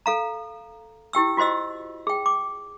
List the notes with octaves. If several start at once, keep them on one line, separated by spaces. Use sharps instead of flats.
A4 F5 A#5
E4 G4 G5 E6
F4 F#4 C5 D#5 E6
G#4 G5
D6